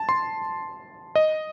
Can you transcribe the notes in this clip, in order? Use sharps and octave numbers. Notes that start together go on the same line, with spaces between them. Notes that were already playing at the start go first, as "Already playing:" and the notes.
Already playing: A5
C6
D#5